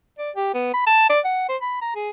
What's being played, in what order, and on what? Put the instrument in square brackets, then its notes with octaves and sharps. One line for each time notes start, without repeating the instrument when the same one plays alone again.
[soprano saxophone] D5
G4
B3
B5
A5
D5
F#5
C5
B5
A#5
G#4